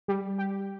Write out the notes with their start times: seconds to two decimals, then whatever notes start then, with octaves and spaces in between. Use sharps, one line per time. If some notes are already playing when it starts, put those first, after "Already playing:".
0.08 G3
0.38 G4